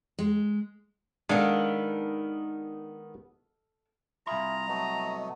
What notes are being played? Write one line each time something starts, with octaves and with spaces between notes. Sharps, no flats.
G#3
D#3 G#3 B3 D4 A4 D#5 F5
C2 F4 G#4 E5 A#5 B5
F#3 A3 B3 D#5